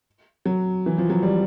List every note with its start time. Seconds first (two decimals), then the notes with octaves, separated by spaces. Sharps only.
0.46 F#3
0.86 E3
0.98 F3
1.10 F#3
1.23 G3